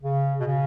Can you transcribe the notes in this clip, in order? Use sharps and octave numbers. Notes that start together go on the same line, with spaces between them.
C#3
B2
C#3